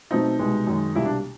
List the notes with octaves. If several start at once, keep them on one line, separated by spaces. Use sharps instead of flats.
B2 F#3 A3 C4 D#4
C2 B2 G#3 B3
F#2 D#3 G#3
C2 B2 G3 A#3 E4
D4